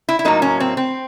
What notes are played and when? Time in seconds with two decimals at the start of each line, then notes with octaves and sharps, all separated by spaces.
0.09 E4
0.19 E4
0.25 A2 F#3 A#3 D#4
0.42 C#4
0.60 C4
0.77 C4